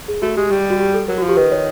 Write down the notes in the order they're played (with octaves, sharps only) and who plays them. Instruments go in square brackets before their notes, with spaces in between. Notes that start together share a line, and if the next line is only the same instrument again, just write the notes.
[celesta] G#4
[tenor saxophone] A3 [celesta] F#4
[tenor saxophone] G#3 [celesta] G4
[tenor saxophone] G3 [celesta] G4
[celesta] G4
F#4
G4
A4
[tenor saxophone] F#3 [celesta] A#4
[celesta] F#4
[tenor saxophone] F3
[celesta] G4
[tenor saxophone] D#3 [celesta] B4
[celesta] C#5